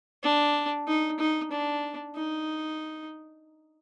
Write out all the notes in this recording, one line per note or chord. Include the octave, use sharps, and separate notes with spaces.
D4
D#4
D#4
D4
D#4